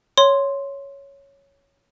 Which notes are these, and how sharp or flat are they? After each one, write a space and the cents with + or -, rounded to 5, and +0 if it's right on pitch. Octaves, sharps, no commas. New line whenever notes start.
C#5 +0 C6 +0